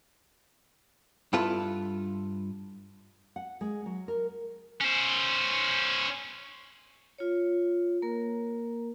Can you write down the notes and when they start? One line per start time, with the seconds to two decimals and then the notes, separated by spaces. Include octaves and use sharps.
1.33 G2 E4 F4 A4 B4
3.36 F#5
3.61 G#3
3.86 F#3
4.08 A#4
4.81 C#4 C5
7.18 F4 C#5
8.02 A#3 A#4